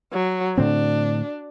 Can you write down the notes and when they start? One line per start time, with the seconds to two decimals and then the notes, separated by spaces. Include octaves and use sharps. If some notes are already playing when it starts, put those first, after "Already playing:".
0.13 F#3
0.58 A2 D3 C4 D4